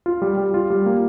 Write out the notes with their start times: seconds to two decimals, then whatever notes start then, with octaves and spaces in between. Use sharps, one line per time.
0.06 F4
0.22 G3
0.37 G3
0.54 F4
0.70 G3
0.86 A#3